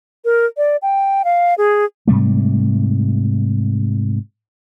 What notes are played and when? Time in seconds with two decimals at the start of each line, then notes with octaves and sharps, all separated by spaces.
0.25 A#4
0.57 D5
0.82 G5
1.25 F5
1.58 G#4
2.07 G#2 C3 G3 A3